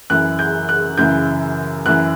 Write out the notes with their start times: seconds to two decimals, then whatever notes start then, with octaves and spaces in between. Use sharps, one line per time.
0.10 F#2 E3 F#6
0.39 G6
0.69 F#6
0.98 F#2 C#3 E3 G6
1.86 F#2 E3 F#6